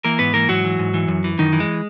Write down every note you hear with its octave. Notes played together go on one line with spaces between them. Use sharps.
E3 A#3 A#4
G#2 B3 B4
E3 A#3 A#4
G#2 F#3 F#4
E3
G#2
E3
F#2
E3
F#2 D#3 D#4
E3
G#3